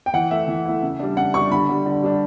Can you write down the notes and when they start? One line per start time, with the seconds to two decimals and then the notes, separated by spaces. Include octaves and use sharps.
0.06 G5
0.14 E3 F#5
0.31 A3 E4 E5
0.48 E3
0.65 A3 E4
0.82 C#3
0.99 G3 D4
1.17 C#3 F#5
1.34 G3 D4 C#6
1.51 D3 B5
1.69 G3 D4
1.86 D3
2.03 G3 D4